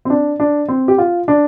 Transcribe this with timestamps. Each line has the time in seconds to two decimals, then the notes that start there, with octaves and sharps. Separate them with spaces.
0.05 C4
0.10 D4
0.40 D4
0.68 C4
0.88 G4
0.98 F4
1.28 D4